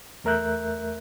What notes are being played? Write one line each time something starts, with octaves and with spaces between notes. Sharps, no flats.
E2 A3 A#4 E5 F#6 G6